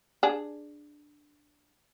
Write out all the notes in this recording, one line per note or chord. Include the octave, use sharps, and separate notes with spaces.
D4 G#4